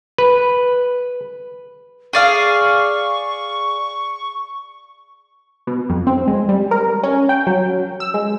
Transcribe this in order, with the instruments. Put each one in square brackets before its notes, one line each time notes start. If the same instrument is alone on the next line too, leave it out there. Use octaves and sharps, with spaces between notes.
[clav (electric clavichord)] B4
[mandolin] G#4 D5 F5 [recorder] C#6
[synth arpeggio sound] B2
F2
C4
G#3
G3
A#4
C#4
G5
F#3
E6
G#3